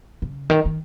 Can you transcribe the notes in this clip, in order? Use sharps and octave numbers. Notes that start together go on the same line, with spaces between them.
C#3
D#3
D#3